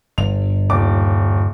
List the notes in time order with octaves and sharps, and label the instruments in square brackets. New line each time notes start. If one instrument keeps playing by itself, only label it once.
[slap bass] G1 [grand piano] F7
[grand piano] D#1 D6